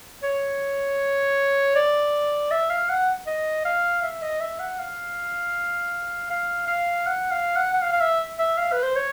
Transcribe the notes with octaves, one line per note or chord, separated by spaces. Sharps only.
C#5
D5
E5
F5
F#5
D#5
F5
E5
D#5
E5
F#5
F5
F5
F5
F#5
F5
F#5
F#5
F5
F5
E5
E5
F5
B4
C5
C#5